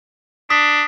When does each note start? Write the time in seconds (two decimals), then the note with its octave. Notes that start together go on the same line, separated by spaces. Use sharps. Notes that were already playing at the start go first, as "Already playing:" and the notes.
0.50 D4 D#6 B6